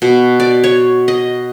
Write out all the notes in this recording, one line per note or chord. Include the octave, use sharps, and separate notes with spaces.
B2
D5
C#5
D#5